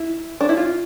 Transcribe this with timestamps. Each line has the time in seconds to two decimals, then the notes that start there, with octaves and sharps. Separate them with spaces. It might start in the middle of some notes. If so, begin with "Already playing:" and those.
Already playing: E4
0.41 D4
0.49 E4
0.57 F4